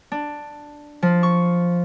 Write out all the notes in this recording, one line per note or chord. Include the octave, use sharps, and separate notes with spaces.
D4
F3
C#6